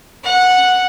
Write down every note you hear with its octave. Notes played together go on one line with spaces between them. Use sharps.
F#5